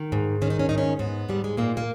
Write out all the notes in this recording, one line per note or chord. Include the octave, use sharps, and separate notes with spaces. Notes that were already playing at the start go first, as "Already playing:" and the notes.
Already playing: D#3
G#2
D#3 C#4
D#4
C#4
G#2 D#4
C#4
G#2 B3
G#2 G3
G#3
A#2 A#3
A#3